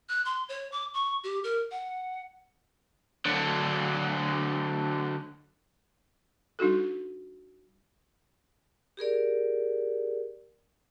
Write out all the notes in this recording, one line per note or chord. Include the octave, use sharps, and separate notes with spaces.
F#6
C6
C#5
D6
C#6
G4
A#4
F#5
D3 F#3
G3 D4 D#4 F#4 A4
G4 G#4 A#4 D5